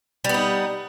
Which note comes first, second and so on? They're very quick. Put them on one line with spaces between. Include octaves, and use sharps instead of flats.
G3 B3 D#4